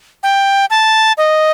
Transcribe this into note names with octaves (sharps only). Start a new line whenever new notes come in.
G5
A5
D#5